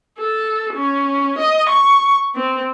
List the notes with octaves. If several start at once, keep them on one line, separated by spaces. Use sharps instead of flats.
A4
C#4
D#5
C#6
C4